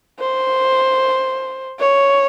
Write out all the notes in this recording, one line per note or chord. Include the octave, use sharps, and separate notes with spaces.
C5
C#5